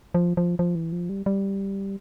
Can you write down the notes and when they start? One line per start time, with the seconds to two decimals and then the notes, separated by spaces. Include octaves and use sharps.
0.14 F3
0.37 F3
0.59 F3
0.75 E3
0.92 F3
1.09 G3
1.26 G3